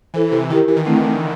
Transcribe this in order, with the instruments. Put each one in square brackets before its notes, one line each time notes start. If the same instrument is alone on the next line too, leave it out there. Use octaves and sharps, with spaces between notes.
[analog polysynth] E3 [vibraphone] E4 A4 C5
[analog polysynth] C3
[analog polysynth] D#3 [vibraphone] E4 G4 A#4
[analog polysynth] E3
D#3
[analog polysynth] D3 [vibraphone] A3 C4 E4